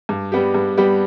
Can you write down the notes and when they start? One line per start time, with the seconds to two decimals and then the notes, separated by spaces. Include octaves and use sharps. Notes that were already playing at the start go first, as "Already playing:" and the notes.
0.09 G2
0.32 G3 B3 G4
0.54 G2
0.77 G3 B3 G4